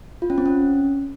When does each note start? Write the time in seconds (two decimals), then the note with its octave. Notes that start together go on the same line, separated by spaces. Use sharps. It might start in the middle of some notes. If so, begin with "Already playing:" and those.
0.22 F4
0.30 C#4
0.38 C4
0.46 C#4